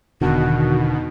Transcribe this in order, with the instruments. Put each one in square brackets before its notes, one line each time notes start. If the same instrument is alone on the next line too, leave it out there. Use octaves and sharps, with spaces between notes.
[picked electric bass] E1 D3 [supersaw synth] B2 D#3 [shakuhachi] F#4